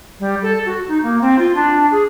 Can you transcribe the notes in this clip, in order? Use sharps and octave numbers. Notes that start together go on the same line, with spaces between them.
G3
A4
F#4
D#4
A#3
C4
F4
D4
G#4